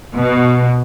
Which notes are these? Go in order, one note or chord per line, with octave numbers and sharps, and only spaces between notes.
B2